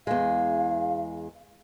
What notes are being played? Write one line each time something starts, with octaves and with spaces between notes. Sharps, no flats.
E2 G#3 F5